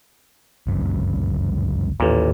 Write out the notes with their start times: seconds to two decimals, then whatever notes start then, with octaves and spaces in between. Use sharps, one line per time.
0.67 G1 C#2 F#2
2.00 A1 D#2 A#2